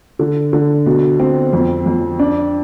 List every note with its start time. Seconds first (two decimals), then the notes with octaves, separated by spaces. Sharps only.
0.19 D3
0.53 D3
0.86 B2
1.20 C4
1.53 F2
1.86 F2
2.19 D4